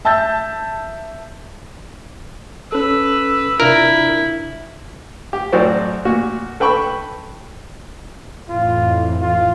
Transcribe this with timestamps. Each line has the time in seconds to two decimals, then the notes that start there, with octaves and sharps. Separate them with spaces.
0.05 E5 A5 E6 G6 A6
2.72 C#4 A4 B4 E6
3.60 C3 D4 E4 F4 A#4
5.33 G4
5.52 A1 F#3 F#4 C5 D5
6.05 A#2 F#4
6.60 A4 B4 G5 B5 C#6
8.49 F2 A2 E3 F4
9.21 F4